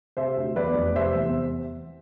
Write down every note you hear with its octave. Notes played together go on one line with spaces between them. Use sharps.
C3 C5 E5
D2
E2 B4 D5
F1
C3 C5 E5
E2
C5